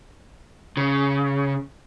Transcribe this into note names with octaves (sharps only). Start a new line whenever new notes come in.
C#3